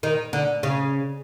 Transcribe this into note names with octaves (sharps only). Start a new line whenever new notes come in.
D#3
D3
C#3